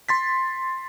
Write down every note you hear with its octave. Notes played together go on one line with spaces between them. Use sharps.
C6 A6 B6